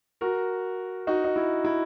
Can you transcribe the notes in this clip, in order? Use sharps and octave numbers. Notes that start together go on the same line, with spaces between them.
F#4 A#4
D#4 F#4
D#4
E4
E4